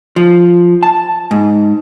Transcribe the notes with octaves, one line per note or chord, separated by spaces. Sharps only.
F3
A5
G#2